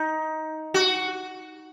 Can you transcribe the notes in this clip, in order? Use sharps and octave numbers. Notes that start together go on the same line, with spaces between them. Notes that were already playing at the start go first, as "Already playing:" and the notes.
Already playing: D#4
F#4